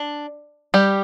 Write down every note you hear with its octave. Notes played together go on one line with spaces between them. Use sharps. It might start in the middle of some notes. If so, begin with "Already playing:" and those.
Already playing: D4
G3 G4